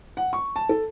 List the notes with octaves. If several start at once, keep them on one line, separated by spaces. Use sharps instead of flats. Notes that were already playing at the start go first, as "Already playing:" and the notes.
F#5
C#6
A5
A4